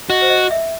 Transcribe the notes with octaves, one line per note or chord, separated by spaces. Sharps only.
F#4 D#5
C5
D#5
E5